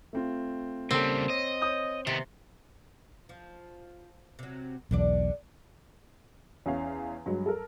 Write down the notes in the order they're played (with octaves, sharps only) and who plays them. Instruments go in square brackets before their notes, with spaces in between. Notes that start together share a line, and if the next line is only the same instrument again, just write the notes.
[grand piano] A3 C4 F4
[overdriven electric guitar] C#3 G3 [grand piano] A#3 A4 [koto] C4
[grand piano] C#5 [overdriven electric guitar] D#5
[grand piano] C#5 D#6 G6
[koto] C3 [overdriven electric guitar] D#3 B3 [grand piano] A6
[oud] F3
C3 F#3
[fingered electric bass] B1 E2 [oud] D3 D4 D5
[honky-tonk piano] E2 C#4 F5
G2 F#3 G#3
A4 A#4